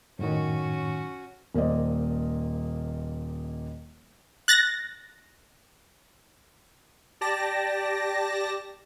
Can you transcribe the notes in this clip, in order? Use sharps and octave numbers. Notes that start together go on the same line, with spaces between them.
F#2 A2 D#3 C#4 F#4
D#1 A#3 C5 D5 D#5
F#6 A6 A#6
G4 D5 A5 A#6